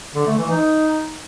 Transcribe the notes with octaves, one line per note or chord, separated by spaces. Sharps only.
D3
A3
E3
D#4